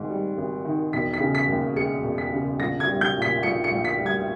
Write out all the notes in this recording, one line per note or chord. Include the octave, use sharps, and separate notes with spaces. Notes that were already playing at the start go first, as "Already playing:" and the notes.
Already playing: G#1 G#2 D#3
G3
G#1
D#3
E1 B6
B6
C#3
B6
D#2
G#3 C#7
E1
B6
C#3
A#1 A#6
G#6
G3
G6
A#2
B6
A#1 C#7
C#7
A#1
B6
G3
G#6